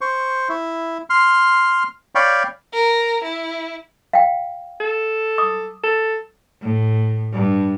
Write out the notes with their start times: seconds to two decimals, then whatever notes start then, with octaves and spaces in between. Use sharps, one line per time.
0.01 C5 C#6
0.49 E4
1.10 C6 F6
2.15 C#5 D5 F5 G5 B5 C#6
2.73 A#4
3.23 E4
4.13 F5 G5
4.80 A4
5.38 D6 D#6
5.83 A4
6.62 A2
7.33 G2